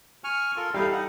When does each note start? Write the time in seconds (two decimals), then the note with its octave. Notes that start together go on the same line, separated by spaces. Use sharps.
0.24 G#5 C#6 F6
0.56 F4 A4 A#4
0.74 G3 D#4 E4 A4 F5
0.92 D#4 F#5